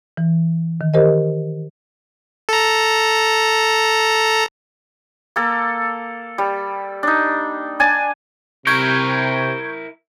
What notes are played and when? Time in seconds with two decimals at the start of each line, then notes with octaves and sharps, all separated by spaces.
0.17 E3
0.81 D#3
0.94 G4 A#4 C5 D#5
2.49 A4 A#5
5.36 A#3 A4
6.38 G3
7.03 D4 D#4
7.80 D4 G#5 A5
8.67 C3 E4 A#4 C#6 G6 G#6